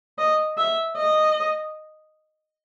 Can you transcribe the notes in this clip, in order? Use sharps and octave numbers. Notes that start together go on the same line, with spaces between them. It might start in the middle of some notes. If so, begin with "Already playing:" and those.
D#5
E5
D#5